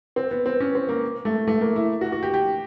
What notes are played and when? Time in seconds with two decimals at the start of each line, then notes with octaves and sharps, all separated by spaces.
0.16 C4
0.31 B3
0.46 C4
0.60 C#4
0.75 C4
0.89 A#3
1.25 A3
1.47 A3
1.61 A#3
1.76 E4
2.01 F#4
2.12 F#4
2.23 G4
2.34 G4